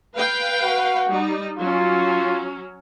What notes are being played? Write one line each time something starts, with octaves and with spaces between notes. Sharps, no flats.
B4 F5 G5
F#4
G3 D#4
F#3 C#4 F4